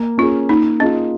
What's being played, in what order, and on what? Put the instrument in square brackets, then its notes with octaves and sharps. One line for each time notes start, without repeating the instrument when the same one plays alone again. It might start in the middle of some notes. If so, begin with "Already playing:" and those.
Already playing: [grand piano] A#3
[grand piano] C#4 G#4 [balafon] F4
[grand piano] A#3 [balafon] D#4
[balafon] C#4 [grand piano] F4 G#4 D#5